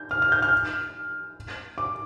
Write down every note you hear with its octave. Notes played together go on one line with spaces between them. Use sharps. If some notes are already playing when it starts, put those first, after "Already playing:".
Already playing: G6
F6
F6
G6
F6
D6